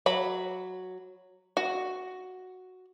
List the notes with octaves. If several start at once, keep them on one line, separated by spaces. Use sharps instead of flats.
F#3 B5
F#4